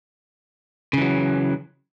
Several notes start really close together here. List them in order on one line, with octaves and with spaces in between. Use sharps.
C#3 E3 F#3